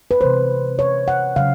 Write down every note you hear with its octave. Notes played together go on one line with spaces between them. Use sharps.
B4
C3 E3 G#3 C5
C#5
F#5
C#3 F#3 F5